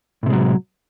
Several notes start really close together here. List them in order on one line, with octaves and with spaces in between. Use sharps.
A2 C3 G#3 F#3